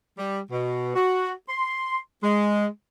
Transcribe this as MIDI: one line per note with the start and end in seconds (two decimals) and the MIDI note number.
0.18 0.40 55
0.51 0.92 47
0.95 1.32 66
1.49 1.98 84
2.23 2.67 56